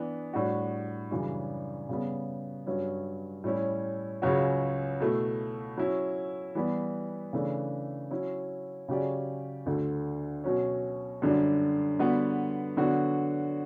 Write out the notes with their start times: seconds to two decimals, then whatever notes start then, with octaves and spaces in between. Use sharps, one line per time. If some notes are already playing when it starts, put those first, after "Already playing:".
Already playing: E3 B3 D4
0.33 A2 G3 D4 F#4
1.11 F#2 C#3 E3 G3 D4
1.89 C#3 G3 B3
2.66 G2 F#3 C#4
3.44 A2 G3 C#4 E4
4.22 C#2 C#3 F#3 C#4 F#4
5.00 B2 A3 E4
5.78 F#3 C#4 E4
6.55 E3 G3 B3
7.33 C#3 E3 A3 D4
8.11 F#3 C#4 E4
8.88 C#3 F#3 C#4 G4 D5
9.66 D2 D3 A3
10.44 B2 F#3 C#4
11.22 F#2 D3 G3 D4
11.99 D3 G3 B3 F#4 B4
12.77 D3 F#3 B3 D4 F#4